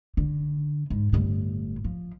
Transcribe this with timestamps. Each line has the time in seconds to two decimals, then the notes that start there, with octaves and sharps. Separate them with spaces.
0.17 D3
0.90 G#2
1.12 G1 A2
1.84 F3